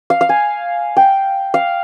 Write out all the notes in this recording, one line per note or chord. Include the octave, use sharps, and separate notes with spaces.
F5
F5
G#5
G5
F5